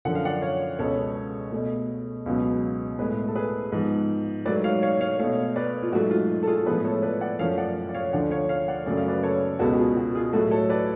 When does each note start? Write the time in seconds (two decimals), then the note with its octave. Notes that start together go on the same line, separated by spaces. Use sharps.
0.05 F#2 D3 F3 F#5
0.15 F5
0.25 D5 F#5
0.42 C#5 F5
0.79 C#2 B2 G#3 B3 A4 C#5
1.52 B2 A3
2.26 C#2 B2 F#3 B3
2.99 A2 G#3 B3 G#4 B4
3.28 A4
3.36 G#4 B4
3.72 G#2 F3 B3
4.45 G#2 F#3 A3 B4 D5
4.64 C#5 F5
4.82 C#5 F5
5.01 C#5 F5
5.19 B2 A3 C#5 F5
5.56 B4 D5
5.83 F4
5.92 G#2 F#3 A3 F#4
6.11 F4
6.43 A4
6.47 F4 G#4
6.66 A2 F3 G#3 B3 G#4 B4
6.84 A4 C#5
7.03 B4 D5
7.21 D5 F#5
7.39 F#2 F3 A3 C#5 F5
7.58 D5 F#5
7.89 D5
7.95 C#5 F5
8.13 D2 D3 F3 D5 F#5
8.31 C#5 F5
8.49 C#5 F5
8.68 D5 F#5
8.86 F#2 C#3 F#3 A3 D5
8.97 F5
9.08 B4 D5
9.23 A4 C#5
9.59 C#2 B2 G#3 B3 F#4 A4
9.73 F#4
9.78 F4 G#4
9.97 F#4
10.15 F4 G#4
10.33 A2 F#3 A3 F#4 A4
10.51 A4 C#5
10.70 B4 D5